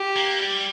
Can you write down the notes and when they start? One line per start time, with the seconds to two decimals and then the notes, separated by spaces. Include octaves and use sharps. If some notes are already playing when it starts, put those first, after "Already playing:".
Already playing: G4
0.16 A#3
0.39 G3